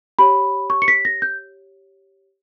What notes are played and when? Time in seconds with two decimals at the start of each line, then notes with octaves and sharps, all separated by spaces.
0.19 G4 C#5 B5
0.70 C#6
0.82 C#7
0.88 B6
1.05 A#6
1.22 G6